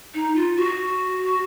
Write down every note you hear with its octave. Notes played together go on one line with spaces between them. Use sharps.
D#4
F4
F#4